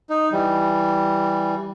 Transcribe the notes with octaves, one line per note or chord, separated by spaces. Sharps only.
D#4
E3 G3